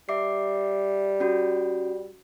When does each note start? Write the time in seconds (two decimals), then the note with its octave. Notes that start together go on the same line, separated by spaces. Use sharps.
0.09 G3 E5 D6 C7
1.20 C#4 F#4